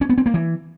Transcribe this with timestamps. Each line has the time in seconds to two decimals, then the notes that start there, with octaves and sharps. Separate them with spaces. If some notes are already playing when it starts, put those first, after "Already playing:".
0.01 C#4
0.09 B3
0.18 C4
0.26 A#3
0.34 E3